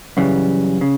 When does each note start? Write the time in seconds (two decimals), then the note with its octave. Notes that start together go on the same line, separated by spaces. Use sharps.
0.17 F#2 C#3 E3 G3
0.81 C#3